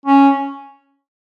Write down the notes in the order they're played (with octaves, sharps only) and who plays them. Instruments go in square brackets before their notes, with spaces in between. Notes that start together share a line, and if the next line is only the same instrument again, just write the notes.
[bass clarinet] C#4